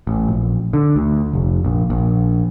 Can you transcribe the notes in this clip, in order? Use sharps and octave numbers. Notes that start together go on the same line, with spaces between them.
A1
A#1
D3
D2
F1
A#1
A#1